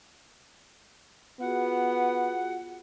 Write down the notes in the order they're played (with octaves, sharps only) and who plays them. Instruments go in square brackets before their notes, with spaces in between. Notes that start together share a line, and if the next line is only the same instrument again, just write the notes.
[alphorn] B3 [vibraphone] F4 F#4 G#4 [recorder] F#5